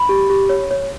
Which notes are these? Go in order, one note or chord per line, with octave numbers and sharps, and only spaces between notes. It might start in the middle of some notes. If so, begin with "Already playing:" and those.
Already playing: B5
G4
G4
C#5
C#5